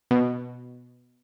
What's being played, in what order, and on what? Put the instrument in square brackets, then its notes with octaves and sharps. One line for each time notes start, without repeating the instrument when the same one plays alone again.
[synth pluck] B2